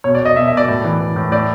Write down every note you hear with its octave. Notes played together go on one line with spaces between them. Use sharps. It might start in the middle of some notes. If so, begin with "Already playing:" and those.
B2 C#5
D5
B2 D#5
B2 E5
E5
B2 D5
A2
E3
E3
A2
A2 D5